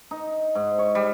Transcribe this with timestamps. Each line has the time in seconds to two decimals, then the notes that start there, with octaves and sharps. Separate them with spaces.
0.11 D#4
0.55 G#2
0.78 C#5
0.95 G3